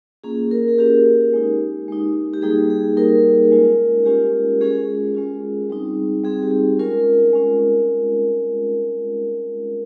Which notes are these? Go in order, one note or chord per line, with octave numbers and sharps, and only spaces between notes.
A#3 C#4 F4 G#4
A#4
G#4
A#3 C#4 F4 G4
G#3 D#4
G#3 D#4
G4
G3 A#3 D#4 G#4
G#4
G3 A#3 D#4 A#4
G#3 C#4 F4
G#3 C#4 F4 G4
G#3 C#4 F4 G#4
G#3 C#4 F4
G3 C4 D#4
G3 C4 D#4 G#4
G4
G#4
G#3 C#4 F4 A#4
G#3 C#4 F4